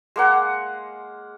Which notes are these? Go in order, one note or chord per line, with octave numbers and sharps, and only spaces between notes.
G#3 A#3 F#5